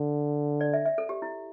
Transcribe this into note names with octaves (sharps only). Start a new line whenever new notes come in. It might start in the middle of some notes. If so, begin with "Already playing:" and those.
Already playing: D3
D5
E5
E5
A4
G4
E4